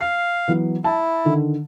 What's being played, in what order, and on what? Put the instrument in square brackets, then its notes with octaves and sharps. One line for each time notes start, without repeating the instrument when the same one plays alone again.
[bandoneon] F5 [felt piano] C7
[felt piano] E3 F#3 B3
[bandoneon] E4 [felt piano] A5
[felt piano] D3 D#3